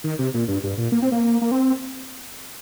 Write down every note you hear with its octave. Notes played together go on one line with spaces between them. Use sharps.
D#3
C3
A#2
G2
G2
A#2
A#3
C4
A#3
A#3
C4